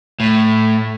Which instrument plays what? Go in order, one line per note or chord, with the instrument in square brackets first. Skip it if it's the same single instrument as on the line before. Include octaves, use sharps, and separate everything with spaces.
[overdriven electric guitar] A2